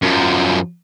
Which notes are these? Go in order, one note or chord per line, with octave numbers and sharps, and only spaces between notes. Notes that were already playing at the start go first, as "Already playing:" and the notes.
F#2 F3